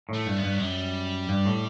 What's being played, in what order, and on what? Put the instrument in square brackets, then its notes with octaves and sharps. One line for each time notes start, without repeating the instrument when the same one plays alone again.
[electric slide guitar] A2
[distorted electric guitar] A3
[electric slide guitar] G2
[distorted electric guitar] B3
[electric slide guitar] G2
[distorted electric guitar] F#3
[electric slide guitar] F#2 [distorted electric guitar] G3
[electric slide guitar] G2
A2